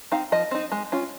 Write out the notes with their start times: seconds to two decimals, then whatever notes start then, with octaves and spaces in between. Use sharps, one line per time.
0.12 C4 D#4 F5
0.32 F3 D#5
0.51 C4 D#4
0.72 G#3
0.92 C#4 F4